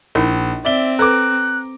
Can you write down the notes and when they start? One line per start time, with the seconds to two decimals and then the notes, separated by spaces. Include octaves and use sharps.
0.15 A#1 D#4 E4 A#4
0.65 C4 D5 E5 G7
0.99 A4 B4 A#5 D6 F#6